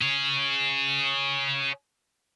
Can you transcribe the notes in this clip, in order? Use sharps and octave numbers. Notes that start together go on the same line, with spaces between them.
G#4 C#5